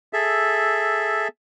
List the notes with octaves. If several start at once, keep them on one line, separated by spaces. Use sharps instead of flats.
G#4 A4 E5